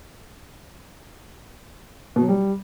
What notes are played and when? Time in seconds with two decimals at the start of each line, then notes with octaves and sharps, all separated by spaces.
2.16 B2
2.22 F#3
2.29 G3